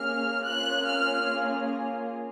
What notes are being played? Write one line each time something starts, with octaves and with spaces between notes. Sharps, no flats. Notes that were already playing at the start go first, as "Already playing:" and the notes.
Already playing: A#3 C#4 G#4 F6
A#3 C#4 F4 G#4 F#6
F6